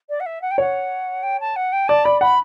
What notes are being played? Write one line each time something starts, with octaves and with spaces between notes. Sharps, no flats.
D5
F#5
E5
F#5
G5
C#5 F#5
G5
A5
F#5
G5
D5 A5
D5 B5
F#5 B5